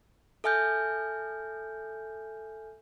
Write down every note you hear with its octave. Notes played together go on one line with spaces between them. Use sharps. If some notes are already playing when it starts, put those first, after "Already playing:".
A4 E5 G#5 F6 G6